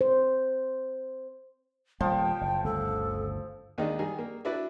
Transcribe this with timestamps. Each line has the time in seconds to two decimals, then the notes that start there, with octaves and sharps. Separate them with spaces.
0.01 C5
2.01 D#1 F3 G3 A#3 G5
2.41 F#1
2.64 G1 D2 C#3 A4
3.78 D#2 D#3 G#3 D4 D#4
3.99 D#3 G3 G#4
4.19 A#3
4.45 D4 E4 F#4 B4 D5 E5